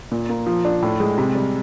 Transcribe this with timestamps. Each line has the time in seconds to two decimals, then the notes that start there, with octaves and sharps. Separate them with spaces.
0.11 A#2
0.29 A#3
0.47 F3
0.65 D4
0.83 A2
1.00 G#3
1.18 C3
1.35 G3